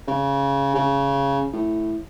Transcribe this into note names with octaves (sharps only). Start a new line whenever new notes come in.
C#3
C#3
A2